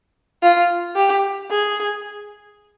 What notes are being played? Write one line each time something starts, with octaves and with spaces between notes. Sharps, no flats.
F4
G4
G#4